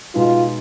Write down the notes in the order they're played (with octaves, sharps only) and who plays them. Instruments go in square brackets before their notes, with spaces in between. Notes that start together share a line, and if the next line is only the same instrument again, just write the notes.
[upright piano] B2 G#3 B3 D#4 [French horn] F4